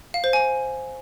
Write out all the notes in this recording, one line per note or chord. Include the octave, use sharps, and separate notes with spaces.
F5
C5
G#5